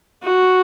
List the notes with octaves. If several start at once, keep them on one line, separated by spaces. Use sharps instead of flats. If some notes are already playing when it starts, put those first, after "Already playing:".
F#4